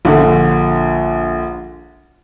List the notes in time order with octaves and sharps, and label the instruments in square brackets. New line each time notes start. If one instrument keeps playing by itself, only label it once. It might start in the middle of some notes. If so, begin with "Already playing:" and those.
[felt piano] A#1 D3